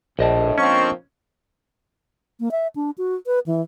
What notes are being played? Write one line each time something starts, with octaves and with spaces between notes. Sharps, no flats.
A#1 A2 D3 D#5 A5
F3 A#3 C4 C#4 C#6
A#3
E5
D4
F#4
B4
E3